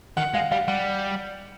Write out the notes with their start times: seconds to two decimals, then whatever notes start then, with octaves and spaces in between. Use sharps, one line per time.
0.17 D#3 F#5
0.34 G#3 F5
0.52 G3 F5
0.68 G3 F#5